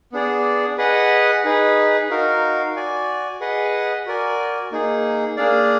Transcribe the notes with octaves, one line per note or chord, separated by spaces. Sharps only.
B3 D4 G#4 D5
G#4 B4 D#5 F#5
D#4 G#4 B4
D#4 F#4 A#4 F5
F#4 D5 G#5
G#4 B4 D#5 F#5
F#4 A#4 D5 G#5
A#3 D#4 G#4
A#3 D4 G#4 D5 F5